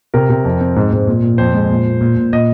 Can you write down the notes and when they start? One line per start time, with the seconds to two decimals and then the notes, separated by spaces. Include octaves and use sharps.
0.14 C3 A#4
0.29 C3
0.45 F2
0.61 C4
0.76 G#2
0.92 G#2
1.07 A#2
1.22 A#2
1.38 F2 C5
1.54 G#3
1.70 A#2
1.85 A#2
2.01 A#2
2.17 A#2
2.33 A#2 D#5